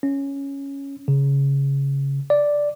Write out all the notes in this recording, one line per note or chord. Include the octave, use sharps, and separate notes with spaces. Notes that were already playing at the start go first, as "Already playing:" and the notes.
C#4
C#3
D5